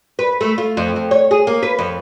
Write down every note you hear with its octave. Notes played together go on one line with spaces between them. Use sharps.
B4
A3
F4
F2
F2
C#5
G#4
A#3
B4
F2